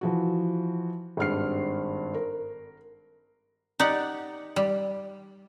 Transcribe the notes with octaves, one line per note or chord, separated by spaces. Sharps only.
E3 F3 F#4
G#1 G2 F6 C7
A#4
D#4 G4 D5 F#5
G3